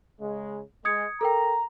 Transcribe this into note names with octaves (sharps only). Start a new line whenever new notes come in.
C#3 G#3
G#3 D#6 G#6 C#7
A4 A#4 G5 A#5